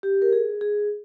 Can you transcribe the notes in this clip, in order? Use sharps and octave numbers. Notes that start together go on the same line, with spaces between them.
G4
A#4
G#4
G#4